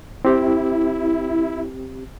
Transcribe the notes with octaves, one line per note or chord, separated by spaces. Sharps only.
C4 E4 G4